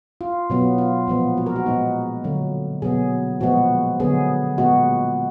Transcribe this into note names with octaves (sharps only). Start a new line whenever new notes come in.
F4
B2 F#3 B3
F4
A#2 F3 G#3 B3
F#4
A#4
F#4
A#2 G#3 B3 D#4
D3 F#3 A#3
B2 F#3 B3 G#4
A#2 F3 G#3 B3 F#4
D3 F#3 B3 G#4
A#2 G#3 B3 F#4